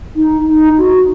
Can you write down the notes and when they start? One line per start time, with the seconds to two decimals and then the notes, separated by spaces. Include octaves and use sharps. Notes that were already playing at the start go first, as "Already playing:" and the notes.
0.16 D#4
0.47 D#4
0.78 F#4